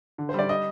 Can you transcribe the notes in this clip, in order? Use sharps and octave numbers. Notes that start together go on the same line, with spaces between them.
D3
C5
G3 D5
D#5